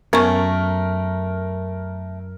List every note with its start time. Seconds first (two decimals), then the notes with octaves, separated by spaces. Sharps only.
0.13 F#2 A3 B3 C#4 A#4 F5 G#5 C#6